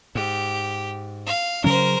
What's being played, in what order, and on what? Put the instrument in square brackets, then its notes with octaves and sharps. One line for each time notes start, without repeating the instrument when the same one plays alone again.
[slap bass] G#2 [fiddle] G4
[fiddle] F5
[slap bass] C#3 F#3 C#4 [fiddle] A#4 C5